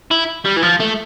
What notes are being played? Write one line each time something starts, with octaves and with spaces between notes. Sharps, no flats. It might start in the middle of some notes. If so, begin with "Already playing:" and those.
E4
G3
E3
F3
A3